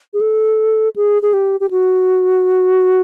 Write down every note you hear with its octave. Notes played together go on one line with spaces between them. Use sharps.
G#4
A4
G#4
G#4
G4
G4
F#4